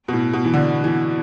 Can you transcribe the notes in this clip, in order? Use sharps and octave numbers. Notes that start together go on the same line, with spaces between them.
B2
A2
B2
E3
D3
E3